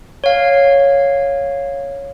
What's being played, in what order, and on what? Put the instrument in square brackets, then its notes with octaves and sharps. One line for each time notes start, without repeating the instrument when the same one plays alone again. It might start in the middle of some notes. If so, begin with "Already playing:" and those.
[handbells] C#5 F5